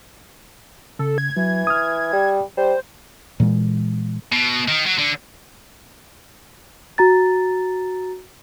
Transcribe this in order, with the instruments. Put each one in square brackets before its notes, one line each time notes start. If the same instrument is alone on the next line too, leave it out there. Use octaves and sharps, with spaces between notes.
[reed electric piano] C#3 [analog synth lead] A4
[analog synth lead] G#6
[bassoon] E3 [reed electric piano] F#3
[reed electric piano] D#6 F6
[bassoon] G3
[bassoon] G3 [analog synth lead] C5
[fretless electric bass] A#2 E3 G#3
[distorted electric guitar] B2
D#3
F#3
D3
[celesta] F#4 A#5 A6